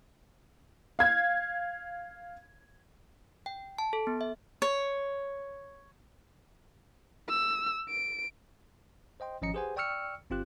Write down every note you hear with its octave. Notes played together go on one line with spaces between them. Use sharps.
F5 G#6
G5
A5
A4
B3
E5
C#5
E6
D7
C5 D#5 G5 C6
G#1 F3 C#4 D#5 A#5 C#7
G4 G#4 B4 C5 F#5 G#5
D5 G5 C#6 E6 F6 C#7
G1 C4 F4 G4 F#6